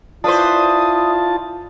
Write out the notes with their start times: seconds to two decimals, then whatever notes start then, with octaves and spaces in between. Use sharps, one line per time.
0.24 D4 E4 F4 B4 C5 A5 D#6